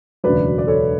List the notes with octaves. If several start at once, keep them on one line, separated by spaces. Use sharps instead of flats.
E1 D2 C#3 F#3 B4 D5
D5
A4 C#5